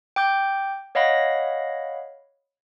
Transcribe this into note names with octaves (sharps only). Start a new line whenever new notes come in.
G5 D6 G6
C#5 D#5 F5 F#5 B5 A#6